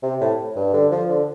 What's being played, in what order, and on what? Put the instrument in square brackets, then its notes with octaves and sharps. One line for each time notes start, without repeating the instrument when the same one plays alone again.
[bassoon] C3
A2
G2
D3
F3
D3